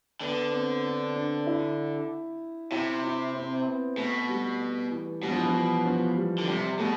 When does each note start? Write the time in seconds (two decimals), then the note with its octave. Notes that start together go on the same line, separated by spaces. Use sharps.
0.21 D3 B3
0.52 C4
0.84 D4
1.16 D4
1.47 E4
2.71 C3 E4
3.04 E4
3.35 C4
3.65 B3
3.97 B2 A3
4.29 G3
4.91 E3
5.22 B2 G3
5.31 F3
5.38 E3
5.45 F3
5.54 E3
5.85 F3
6.16 G3
6.38 D3
6.48 C3 G3
6.79 B2 A3